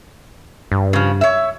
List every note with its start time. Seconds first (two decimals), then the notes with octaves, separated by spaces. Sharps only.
0.72 G2
0.93 C#3 F3
1.21 C#5 E5